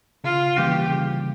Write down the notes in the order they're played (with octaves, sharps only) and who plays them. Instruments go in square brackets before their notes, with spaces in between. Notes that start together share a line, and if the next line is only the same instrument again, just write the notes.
[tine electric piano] C#3 [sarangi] F4
[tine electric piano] E3 G3 A#3 C#4 [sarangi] G4
[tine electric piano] C#3